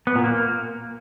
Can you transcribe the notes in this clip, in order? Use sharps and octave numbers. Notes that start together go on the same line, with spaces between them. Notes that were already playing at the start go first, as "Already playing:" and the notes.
B3
A#2
A#3